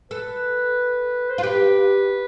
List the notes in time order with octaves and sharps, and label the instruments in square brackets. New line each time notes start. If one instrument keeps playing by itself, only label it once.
[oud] A4 [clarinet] B4
[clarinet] C5
[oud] F4
[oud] G4 [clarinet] B4